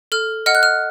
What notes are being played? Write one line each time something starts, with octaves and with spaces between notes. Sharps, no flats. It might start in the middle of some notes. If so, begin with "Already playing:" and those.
A4 F6
D#5 F#5 F6
F#6
F6